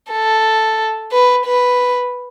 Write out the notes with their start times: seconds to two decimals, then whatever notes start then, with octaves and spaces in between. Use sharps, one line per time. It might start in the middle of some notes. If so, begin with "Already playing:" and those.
0.12 A4
1.12 B4
1.46 B4